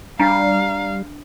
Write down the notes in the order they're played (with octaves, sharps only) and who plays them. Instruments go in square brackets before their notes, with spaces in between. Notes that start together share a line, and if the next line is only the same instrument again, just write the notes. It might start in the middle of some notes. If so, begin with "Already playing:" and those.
[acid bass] G3 [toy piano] D4 G#5 C#6 [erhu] F5 [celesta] A#5